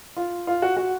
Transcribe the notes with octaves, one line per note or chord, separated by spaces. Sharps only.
F4
F4
F#4
F#4